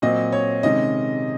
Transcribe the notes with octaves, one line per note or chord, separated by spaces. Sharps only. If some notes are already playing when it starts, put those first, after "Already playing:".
A#2 F#3 C4 D#5
C#5
C3 D#3 G#3 C#4 D#5